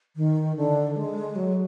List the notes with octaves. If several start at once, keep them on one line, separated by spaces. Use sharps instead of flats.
D#3
D3
G#3
F#3